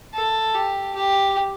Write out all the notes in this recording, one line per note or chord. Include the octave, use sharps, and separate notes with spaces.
A4
G4
G4